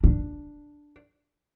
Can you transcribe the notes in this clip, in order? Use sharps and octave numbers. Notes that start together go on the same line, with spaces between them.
D4